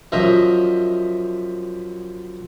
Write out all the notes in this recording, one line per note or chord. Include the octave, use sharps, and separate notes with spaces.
F#2 F3 D#5 E5 A#5